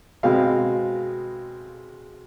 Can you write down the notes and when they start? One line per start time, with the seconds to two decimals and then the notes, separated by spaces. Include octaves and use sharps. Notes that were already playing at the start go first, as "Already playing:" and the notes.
0.23 B2 G#3 C4 F5